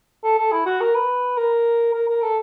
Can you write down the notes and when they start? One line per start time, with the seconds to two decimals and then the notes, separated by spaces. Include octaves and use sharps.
0.24 A4
0.38 A4
0.52 E4
0.66 F#4
0.80 A#4
0.95 B4
1.37 A#4
1.93 A#4
2.08 A#4
2.22 A4